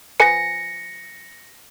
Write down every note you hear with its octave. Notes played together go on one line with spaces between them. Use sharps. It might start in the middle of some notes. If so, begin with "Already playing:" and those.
F3 B4 G#5 A#6 C#7